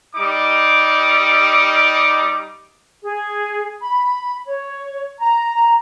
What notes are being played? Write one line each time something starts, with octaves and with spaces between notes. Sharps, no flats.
G3 D#4 D6
G#4
B5
C#5
A#5